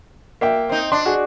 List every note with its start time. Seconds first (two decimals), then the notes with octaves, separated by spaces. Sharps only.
0.41 A#3 E5 G5
0.69 C4 D#4
0.92 D4 C6
1.06 F#4 G#4